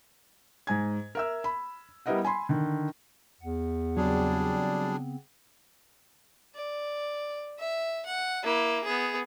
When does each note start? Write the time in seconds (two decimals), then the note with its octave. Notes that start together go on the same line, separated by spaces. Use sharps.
0.67 G#2 G#5 G#6
1.15 A#4 E5 E6
1.44 B5
2.06 G3 B3 E4 A#4 D#5 F#5
2.25 G#5 B5 C6
2.49 D3 D#3
3.41 E2 F#5
3.97 C#3 F#3 G3 B3 C4 D4 G#4
6.55 D5
7.59 E5
8.06 F#5
8.43 A#3 E4
8.85 B3 G#4